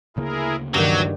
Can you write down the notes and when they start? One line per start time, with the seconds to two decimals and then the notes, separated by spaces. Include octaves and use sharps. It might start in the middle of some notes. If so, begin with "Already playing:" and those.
0.17 D2 C#3 A#3 E4 G#4 A#4
0.74 G2 D#3 E3 F#3